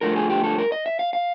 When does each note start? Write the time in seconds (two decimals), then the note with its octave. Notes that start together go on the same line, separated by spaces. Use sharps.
0.01 G2 D3 F3 A3 A#4
0.16 G#4
0.30 G4
0.44 A4
0.58 A#4
0.72 D#5
0.86 E5
0.99 F5
1.13 F5